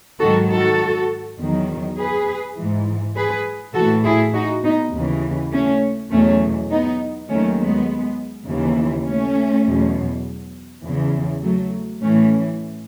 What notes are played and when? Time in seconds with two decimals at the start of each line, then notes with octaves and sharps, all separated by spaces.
0.21 G#2 D#3 F#3 F#4 A4
0.51 F#4 A4
1.39 E2 D#3 F#3
1.98 G#4 B4
2.57 G#2 E3
3.16 G#4 B4
3.75 E3 F#4 A4
3.79 A2
4.05 E4 G#4
4.34 D#4 F#4
4.64 B3 D#4
4.93 D#2 C#3 E3
5.52 A3 C#4
6.11 E2 B2 F#3 A3 C#4
6.70 B3 D#4
7.30 D#2 D#3 F#3 A3 C#4
7.59 G#3 B3
8.47 D#2 C#3 E3
9.06 A3 C#4
9.66 E2 B2 F#3
10.84 E2 C#3 E3
11.43 F#3 A3
12.02 A2 E3 A3 C#4